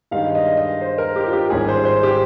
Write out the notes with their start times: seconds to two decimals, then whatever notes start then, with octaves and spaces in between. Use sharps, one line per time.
0.11 G2 D#3 G#3 D#4 F5
0.35 D#5
0.57 D#5
0.81 C5
0.98 A#4
1.16 G4
1.27 F4
1.33 G4
1.50 G#1 G#2 G3 C#4 G#4
1.68 C5
1.85 C5
2.03 G4